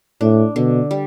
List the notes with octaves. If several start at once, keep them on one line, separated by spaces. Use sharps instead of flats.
A2 D4
B2 D3
G3